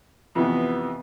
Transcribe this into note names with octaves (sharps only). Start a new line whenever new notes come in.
F2 C3 E3 B3